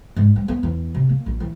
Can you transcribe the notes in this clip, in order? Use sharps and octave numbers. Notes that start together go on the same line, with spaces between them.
G#2
G3
B3
E2
C3
A#3
A#1
E3